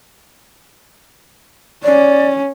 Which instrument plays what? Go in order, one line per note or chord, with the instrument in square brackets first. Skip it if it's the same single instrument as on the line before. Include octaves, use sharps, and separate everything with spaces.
[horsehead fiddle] C#4 [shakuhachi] D5